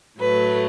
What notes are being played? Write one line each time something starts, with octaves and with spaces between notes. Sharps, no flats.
A2 F#3 A3 B4